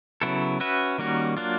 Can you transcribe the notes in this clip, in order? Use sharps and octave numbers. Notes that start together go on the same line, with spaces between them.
C#3 F#3 B3 E4 A4
C#4 F#4 B4 E5
D#3 G3 A#3 C#4 F#4
F#3 A#3 D4 F4